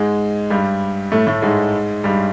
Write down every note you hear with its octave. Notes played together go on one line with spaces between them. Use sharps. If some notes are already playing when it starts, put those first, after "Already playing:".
Already playing: G#2 G#3
G2 G3
A2 A3
A2 A3
G#2 G#3
G2 G3